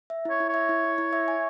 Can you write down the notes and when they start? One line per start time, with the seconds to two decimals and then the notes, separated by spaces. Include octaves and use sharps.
0.10 E5
0.25 E4 C#5
0.40 E4
0.49 C#5 E5
0.69 E4
0.84 E4
0.98 E4
1.13 E5
1.28 G#5